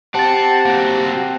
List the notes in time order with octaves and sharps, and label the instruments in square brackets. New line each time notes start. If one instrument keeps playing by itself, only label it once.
[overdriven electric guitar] C4 [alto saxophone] G4 [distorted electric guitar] F#5 [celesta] A5 A6
[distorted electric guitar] A#3 F#4